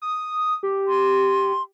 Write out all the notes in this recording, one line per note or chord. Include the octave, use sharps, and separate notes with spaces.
D#6
G4
C6